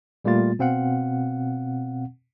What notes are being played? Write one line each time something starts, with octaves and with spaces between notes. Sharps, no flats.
A#2 G3 A3 A#3 F4 A6
B2 C4 F5 F#5